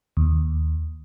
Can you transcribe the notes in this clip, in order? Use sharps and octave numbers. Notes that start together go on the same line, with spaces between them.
D#2